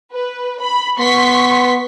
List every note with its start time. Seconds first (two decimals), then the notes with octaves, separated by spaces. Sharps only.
0.12 B4
0.61 B5
0.99 B3 C6 C#6 B6